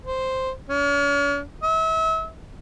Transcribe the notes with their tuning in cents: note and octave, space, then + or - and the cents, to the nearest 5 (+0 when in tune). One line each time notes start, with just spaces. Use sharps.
C5 +0
C#4 +40
E5 -35